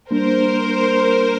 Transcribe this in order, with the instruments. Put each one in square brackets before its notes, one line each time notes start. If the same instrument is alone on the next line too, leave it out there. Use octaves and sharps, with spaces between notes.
[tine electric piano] G3 A#3 D4 [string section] A#4 C5